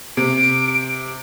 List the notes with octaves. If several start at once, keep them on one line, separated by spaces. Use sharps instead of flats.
C3 D7